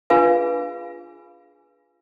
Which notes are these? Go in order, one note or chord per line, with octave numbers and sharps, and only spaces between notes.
D4 F4 G#4 B4 F5 G#5